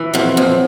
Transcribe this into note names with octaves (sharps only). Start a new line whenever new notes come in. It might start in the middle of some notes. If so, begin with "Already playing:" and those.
Already playing: E3
F2 F#3
F2